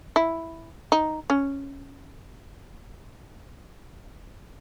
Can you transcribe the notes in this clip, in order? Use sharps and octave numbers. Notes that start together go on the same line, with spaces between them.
E4
D#4
C#4